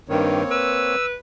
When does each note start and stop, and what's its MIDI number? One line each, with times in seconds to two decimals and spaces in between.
0.09 0.43 43
0.09 0.43 51
0.09 0.95 58
0.09 0.95 60
0.09 0.95 73
0.51 1.15 71
0.51 1.06 88